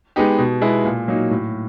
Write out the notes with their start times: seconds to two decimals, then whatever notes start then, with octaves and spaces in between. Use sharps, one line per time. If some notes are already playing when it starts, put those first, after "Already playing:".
0.16 G#3 B3 D#4 G4
0.38 B2
0.62 G#3 B3 E4
0.85 A#2
1.08 F#3 A#3 D#4
1.31 A2